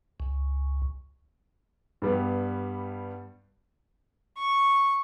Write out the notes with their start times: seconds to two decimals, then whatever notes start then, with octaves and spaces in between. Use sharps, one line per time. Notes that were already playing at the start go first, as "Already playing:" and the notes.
0.20 C#2
2.02 G2 G3 B3
4.36 C#6